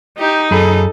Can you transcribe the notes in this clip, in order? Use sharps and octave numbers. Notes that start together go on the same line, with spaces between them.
D#4 G4
F#2 G#4 A4 B5